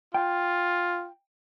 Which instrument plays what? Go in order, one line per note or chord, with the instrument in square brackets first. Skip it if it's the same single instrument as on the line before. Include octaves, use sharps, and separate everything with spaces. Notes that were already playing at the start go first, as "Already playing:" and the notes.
[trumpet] F4 [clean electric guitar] G5